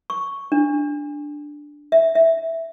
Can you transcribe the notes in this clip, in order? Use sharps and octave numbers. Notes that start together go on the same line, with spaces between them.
C#6
D4
E5
E5